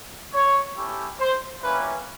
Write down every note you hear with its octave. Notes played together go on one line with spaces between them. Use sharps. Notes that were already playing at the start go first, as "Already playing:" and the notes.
C#5
A3 C#4 E4 G4
C5
G3 A#3 C#4 E4 B4